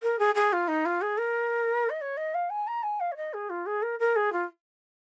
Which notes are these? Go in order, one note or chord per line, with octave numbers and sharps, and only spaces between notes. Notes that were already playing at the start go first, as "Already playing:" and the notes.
A#4
G#4
G#4
F4
D#4
F4
G#4
A#4
D#5
C#5
D#5
F5
G#5
A#5
G#5
F5
C#5
D#5
G#4
F4
G#4
A#4
A#4
G#4
F4